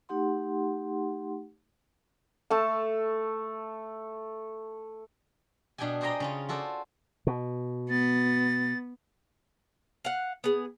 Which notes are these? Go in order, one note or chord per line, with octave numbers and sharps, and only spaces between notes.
A3 D#4 G4 F#5 C6
A3 A4 A5
B2 D4 G#4 G5 G#5
G#4 C5 D5 D#5 G5 A#5
C#3 C#4 F4
F4 F#4 A4 C5 D5
B2
B3 A6
F5 F#5
B3 G#4